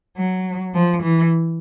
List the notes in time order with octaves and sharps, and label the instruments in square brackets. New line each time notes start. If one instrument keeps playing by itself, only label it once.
[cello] F#3
F3
E3